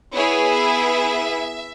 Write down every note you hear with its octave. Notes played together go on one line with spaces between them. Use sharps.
B3 E4 G#4 C#5
E5